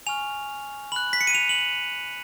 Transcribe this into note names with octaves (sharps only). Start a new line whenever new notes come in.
G#5 C#6 F6 F7
B5 F#6 F#7
B6
C#7
D#7
F7
F#7